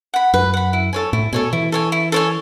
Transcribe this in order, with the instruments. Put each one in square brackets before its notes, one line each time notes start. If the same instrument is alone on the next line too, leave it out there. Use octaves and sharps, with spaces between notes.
[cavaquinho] F#5 B5
[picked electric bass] F#2 [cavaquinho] B4
[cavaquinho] F#5 B5
E4
A4 C#5 G#5
[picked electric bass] A2 [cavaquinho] E4
[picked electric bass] B2 [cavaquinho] A4 C#5 G#5
[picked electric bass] E3 [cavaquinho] E4
[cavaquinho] A4 C#5 G#5
E4
A4 C#5 G#5